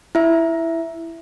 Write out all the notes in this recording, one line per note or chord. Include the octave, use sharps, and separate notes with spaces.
E4 E5